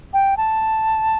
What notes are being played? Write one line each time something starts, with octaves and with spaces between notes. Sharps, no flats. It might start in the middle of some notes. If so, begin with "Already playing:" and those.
G5
A5